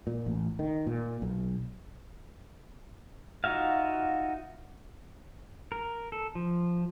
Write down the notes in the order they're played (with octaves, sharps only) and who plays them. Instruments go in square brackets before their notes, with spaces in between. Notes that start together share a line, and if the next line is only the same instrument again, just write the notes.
[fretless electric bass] A#2
A1
D#3
A#2
B1
[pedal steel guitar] D#4 F4 F#4 E5 F5
A#4
A4
F3